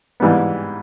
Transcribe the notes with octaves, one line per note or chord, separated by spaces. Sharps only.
G#2 E3 G3 B3